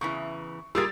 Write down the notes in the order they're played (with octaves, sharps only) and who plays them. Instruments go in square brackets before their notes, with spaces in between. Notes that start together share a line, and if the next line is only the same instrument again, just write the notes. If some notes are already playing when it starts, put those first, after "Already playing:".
[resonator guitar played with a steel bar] E2 C#3 E3 [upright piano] C#6
[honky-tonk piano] G3 G4 A6 [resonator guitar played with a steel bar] F4 G#4 A#4 [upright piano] E6